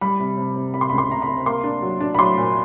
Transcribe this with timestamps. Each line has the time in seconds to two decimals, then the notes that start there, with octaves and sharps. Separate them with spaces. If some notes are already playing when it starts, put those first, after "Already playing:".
0.01 G3 B5
0.20 C3
0.37 C3
0.56 C3
0.74 C3 B5
0.81 C6
0.90 B5
0.92 C#2
0.98 C6
1.10 C3 A#5
1.22 B5
1.29 C3
1.46 A#3 C6
1.64 D4
1.82 F#3
2.00 D4
2.15 B5
2.19 F#3 C6
2.37 A#2